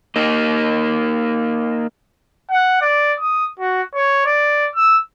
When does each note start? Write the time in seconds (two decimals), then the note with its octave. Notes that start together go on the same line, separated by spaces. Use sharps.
0.16 A#3 D#4
2.50 F#5
2.81 D5
3.20 D#6
3.59 F#4
3.94 C#5
4.26 D5
4.75 E6